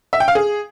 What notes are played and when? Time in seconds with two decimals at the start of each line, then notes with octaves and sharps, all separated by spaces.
0.13 E5
0.20 G5
0.28 F5
0.35 G#4